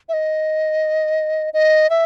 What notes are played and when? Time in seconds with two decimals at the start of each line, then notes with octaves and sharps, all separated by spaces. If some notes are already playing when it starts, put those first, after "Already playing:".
0.09 E5
0.13 D#5
1.54 D#5
1.90 E5